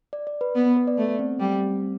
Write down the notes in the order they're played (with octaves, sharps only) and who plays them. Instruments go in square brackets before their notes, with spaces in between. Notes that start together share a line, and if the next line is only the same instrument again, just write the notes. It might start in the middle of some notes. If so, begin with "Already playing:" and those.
[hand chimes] D5
D5
B4
[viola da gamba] B3
[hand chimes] B4
B4
D5
[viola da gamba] A3
[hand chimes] C4
[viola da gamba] G3